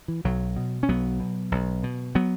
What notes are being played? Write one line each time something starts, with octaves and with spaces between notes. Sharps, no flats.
E3
B1 F#3
B2
C#4
B1 F#3 B3
B2
B1
B2
F#3 B3